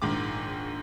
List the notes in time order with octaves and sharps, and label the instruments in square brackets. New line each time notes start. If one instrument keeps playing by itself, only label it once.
[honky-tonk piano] A#1 G#2 D#3 D6